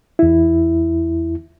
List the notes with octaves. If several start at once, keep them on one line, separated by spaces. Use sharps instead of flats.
E2 E4